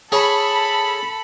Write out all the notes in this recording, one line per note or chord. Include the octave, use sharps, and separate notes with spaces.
G#4 A4 C#5 B5